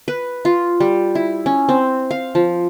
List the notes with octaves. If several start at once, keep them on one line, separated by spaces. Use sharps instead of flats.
B4
F4
G3
E4
C#4
C4
F5
F3